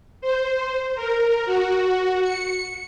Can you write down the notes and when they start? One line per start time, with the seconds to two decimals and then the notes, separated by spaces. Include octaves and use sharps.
0.21 C5
0.96 A#4
1.46 F#4
2.23 C#7